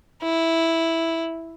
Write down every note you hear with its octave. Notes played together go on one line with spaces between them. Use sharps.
E4